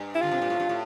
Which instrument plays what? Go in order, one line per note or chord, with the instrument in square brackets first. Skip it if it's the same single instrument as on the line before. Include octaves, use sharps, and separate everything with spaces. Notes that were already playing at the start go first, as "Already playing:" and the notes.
Already playing: [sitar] G2
[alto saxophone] E4
[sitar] D3 [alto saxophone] F4
[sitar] C3
A#2
A2
G2
A2